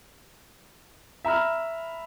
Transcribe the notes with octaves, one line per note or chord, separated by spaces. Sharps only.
E5 A#5 B5 F6